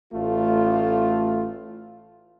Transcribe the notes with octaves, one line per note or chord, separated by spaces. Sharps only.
A1 A3 F4